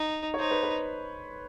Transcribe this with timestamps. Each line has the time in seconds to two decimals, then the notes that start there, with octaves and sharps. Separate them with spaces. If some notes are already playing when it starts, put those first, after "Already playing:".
Already playing: D#4
0.34 C#5
0.39 D#4 C5
0.51 B4
0.63 B4